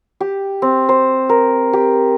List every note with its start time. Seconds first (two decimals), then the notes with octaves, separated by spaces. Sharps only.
0.20 G4
0.62 C4
0.89 C5
1.29 A#4
1.73 G4